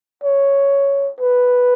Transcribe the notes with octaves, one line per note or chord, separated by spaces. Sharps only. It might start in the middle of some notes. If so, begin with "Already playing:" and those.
C#5
B4